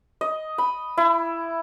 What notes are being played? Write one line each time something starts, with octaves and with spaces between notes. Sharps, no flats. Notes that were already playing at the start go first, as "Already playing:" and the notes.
D#5
B5
E4